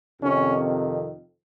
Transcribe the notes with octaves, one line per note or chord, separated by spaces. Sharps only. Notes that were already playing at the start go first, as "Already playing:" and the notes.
F2 C3 D#3 C#4